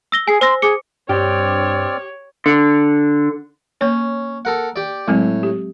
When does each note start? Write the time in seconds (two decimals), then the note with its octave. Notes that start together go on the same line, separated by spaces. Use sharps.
0.12 E6 A#6 G7
0.28 G#4 G#5 C7
0.41 C5 C6 E6 A#6
0.62 G#4 D6 C#7
1.09 G2 C4 G4 C#5 D5 F6
2.46 D3
3.81 A#3 C#4 C#5
4.45 A4 A#4 F#5
4.76 G4 D5
5.08 A2 F#3 G#3 C4
5.43 G4